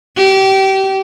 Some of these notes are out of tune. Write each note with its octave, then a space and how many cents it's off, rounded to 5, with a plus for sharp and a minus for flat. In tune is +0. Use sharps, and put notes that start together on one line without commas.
G4 -25